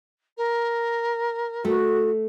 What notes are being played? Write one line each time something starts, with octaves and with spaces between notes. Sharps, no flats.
A#4
A3 F#4